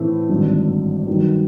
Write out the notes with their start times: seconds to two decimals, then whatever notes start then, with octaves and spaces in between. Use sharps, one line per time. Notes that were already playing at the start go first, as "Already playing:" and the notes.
Already playing: A2 E3 A3 C4
0.29 G#1 G2 D3 F#3
1.07 G2 D#3 F#3